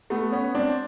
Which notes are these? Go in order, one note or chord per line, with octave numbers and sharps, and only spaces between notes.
A3 B3
B3 C#4
C4 D4